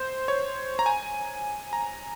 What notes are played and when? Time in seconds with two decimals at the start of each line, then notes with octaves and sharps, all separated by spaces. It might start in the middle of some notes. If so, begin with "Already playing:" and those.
Already playing: C5
0.28 C#5
0.79 A#5
0.86 G#5
1.73 A#5